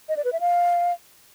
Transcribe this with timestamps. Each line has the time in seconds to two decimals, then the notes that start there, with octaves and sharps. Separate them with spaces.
0.09 D#5
0.17 D5
0.25 B4
0.32 E5
0.40 F5